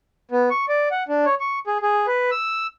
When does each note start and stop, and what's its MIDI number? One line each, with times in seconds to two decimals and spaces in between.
0.31 0.49 59
0.50 0.66 85
0.69 0.89 74
0.91 1.03 78
1.08 1.25 62
1.26 1.35 73
1.40 1.59 85
1.67 1.78 68
1.82 2.07 68
2.07 2.31 71
2.31 2.67 88